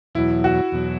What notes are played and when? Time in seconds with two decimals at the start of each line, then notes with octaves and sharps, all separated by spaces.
0.15 E2 B2 F#3 E4
0.44 F#4
0.72 E2 B2 F#3